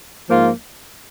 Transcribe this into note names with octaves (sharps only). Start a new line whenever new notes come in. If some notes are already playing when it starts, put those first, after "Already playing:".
G#2 F3 A#3 F4